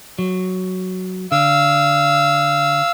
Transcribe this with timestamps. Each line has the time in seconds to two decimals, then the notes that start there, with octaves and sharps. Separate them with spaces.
0.19 F#3
1.32 D3 F5 E6